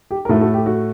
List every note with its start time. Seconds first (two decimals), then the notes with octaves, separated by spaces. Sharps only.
0.11 G4
0.25 A#4
0.29 A2 A3 F#4 A4
0.41 F#4 A4
0.54 G4
0.66 F#4